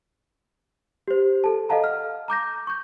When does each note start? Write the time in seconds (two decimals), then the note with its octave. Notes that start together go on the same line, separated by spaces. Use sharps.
1.08 G4 C5
1.44 A4 A5
1.69 A4 D#5 F5 F#5 A5 A#5
1.84 F6
2.28 A#5 D6 G6 A#6
2.67 C#6 G6